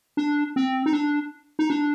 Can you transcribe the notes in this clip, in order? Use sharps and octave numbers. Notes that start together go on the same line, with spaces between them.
D4
C4
D#4
D4
D#4
D4